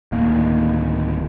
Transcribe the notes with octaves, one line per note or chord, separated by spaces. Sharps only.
D1 D#3 A#3